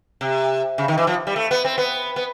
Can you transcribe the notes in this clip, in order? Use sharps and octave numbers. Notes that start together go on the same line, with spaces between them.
C3
C#3
D#3
E3
F3
G3
A3
B3
C4
B3
B3